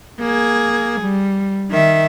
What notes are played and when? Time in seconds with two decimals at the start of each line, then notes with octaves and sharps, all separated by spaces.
0.20 A#3 G#4
1.02 G3
1.71 D#3 E5